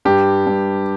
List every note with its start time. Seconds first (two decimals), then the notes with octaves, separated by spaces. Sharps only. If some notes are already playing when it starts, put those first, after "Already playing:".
0.05 G2 G4
0.47 G2